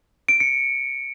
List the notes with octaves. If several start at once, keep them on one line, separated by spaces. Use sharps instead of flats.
D7
C#7